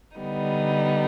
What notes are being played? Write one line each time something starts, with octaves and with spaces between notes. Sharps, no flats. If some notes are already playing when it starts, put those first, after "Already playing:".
D3 G3 B3 D#4